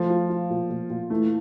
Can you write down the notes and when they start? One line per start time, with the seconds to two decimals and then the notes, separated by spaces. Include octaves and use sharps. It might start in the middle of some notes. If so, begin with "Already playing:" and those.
Already playing: F3 A3
0.10 F4
0.29 F4
0.50 A#2
0.70 A#2
0.90 A#2
1.10 E3 A3